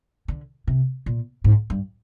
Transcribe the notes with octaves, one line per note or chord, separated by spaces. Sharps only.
D3
C3
A#2
G#2
G2